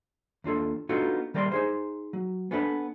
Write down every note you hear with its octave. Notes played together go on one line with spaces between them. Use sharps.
D#2 D4 F4 A4
B3 D4 D#4 F4 F#4 A4
D#3 G3 A#4 D5 B5 C6
D#4 G#4 C5
F#3
B3 C#4 D4 A4 B4